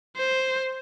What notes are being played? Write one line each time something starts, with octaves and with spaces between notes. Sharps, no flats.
C5